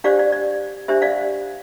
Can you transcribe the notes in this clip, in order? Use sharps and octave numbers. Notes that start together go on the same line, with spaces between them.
D4 G4 C5 D5 F5
D5
D5
D4 G4 C5 E5
D5 F5